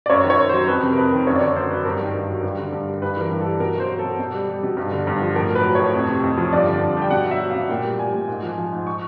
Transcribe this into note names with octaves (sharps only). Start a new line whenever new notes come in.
D5
F#2 C#5
D#3
C#5
F#2
F#3 C5
F2 B4
C3
A#4
F2 B4
D#3
F#2 C#5
D5
D3 C#5
F#2 C5
F#3 B4
G2 A#4
D#3
G2
F#3
G2
D3
G2
G3
G2 B4
E3 A#4
G2
A4
G3
B2 A#4
F#3 C5
F#3
A4
B2
B2
G3
G3
B2
G2
D3
G2
F3
A2 A#4
F#3
B4
F#3
A2 C#5
F2
C3
F2
F3
G2 D5
D3
G2
G3 G5
B2 F#5
F#3
E5
F#3
F5
B2
A#2 G5
G3
G3 G#5
A#2
G#2
F3
F3
G#2
C#6